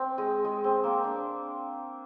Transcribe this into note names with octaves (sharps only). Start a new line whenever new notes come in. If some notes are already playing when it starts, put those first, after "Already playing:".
Already playing: C4
G#3
G#3
C4
A#3
D4